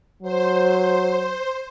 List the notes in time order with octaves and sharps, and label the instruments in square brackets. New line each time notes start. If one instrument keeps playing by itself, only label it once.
[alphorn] F#3 [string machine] C5